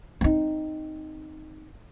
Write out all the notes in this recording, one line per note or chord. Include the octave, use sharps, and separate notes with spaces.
C4 D#4